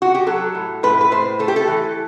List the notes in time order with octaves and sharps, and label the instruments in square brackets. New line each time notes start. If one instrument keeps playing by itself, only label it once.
[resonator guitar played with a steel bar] F#4
G4
F#3 A4
A2
A2 B4
B4
A2 C5
A3 A4
G4
A4
E3